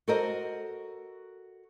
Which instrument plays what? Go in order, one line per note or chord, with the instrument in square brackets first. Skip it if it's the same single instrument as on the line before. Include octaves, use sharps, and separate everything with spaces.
[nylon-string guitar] F#4 A4 A#4 C5 D#5